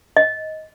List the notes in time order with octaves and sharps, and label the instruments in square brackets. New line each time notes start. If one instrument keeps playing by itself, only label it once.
[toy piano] D#5